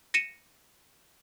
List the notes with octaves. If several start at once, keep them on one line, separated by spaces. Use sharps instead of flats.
A#6 C#7 D#7 E7